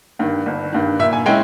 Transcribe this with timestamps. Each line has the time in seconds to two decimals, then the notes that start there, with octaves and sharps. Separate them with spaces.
0.19 G2 D#3
0.46 G1
0.72 G2 D#3
0.99 A#2 E5
1.13 G#5
1.26 G#3 C#4 E4 G5